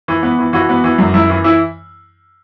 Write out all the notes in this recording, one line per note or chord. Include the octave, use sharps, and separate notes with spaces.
E3
B3
E3
E3 F#4
B3
E3
F#2
F#2 E4
E3
E3 E4